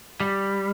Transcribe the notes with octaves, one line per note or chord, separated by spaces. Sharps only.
G3